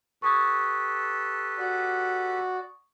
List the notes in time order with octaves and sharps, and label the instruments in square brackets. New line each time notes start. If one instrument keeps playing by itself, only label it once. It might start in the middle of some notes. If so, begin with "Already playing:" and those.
[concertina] G4 A4 B4 [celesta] C#6 D#6 G#6
[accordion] F#4 D5